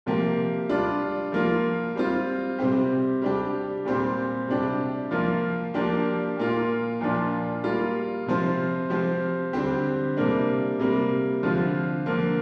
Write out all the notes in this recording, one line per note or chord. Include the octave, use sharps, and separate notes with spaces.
C3 F3 A#3 G4
G3 D4 F4
F3 A#3 F4
G3 C4 F4
C3 G3 C4 G4
G3 D4 G4
A#2 G3 C4 G4
C3 G3 D4 G4
F3 A#3 F4
F3 A#3 D4 G4
A#2 A#3 F4
A#2 F3 D4 F4
G3 A#3 F4
C3 F3 C4 F4
F3 C4 G4
D3 G3 C4 G4
C3 G3 A#3 D4
C3 G3 A#3
D3 F3 C4 F4
D3 F3 A#3